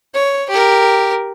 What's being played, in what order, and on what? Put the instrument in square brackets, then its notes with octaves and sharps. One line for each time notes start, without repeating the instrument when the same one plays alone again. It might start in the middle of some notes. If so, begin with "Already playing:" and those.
[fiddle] C#5
G4 A#4